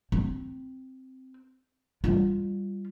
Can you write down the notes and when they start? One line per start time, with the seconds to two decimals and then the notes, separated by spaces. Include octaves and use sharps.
0.12 C4
2.04 G3 F4